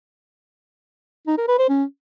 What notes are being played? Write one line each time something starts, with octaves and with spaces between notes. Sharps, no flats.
D#4
A#4
B4
C5
C#4